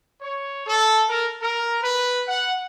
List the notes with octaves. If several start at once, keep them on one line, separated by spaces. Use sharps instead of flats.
C#5
A4
A#4
A#4
B4
F#5